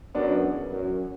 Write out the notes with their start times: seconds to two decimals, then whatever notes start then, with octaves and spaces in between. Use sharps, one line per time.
0.15 F#2 B3 D4
0.43 E2
0.71 F#2